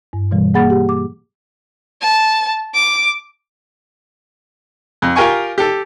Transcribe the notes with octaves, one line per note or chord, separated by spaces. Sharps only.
G2
B2 E3 G3
A#3 G#4 F#5 B5 A6
G4 F#5
D6
A5
D6
F2
F4 G4 A#4 G5 G#5 C#6
G4 A4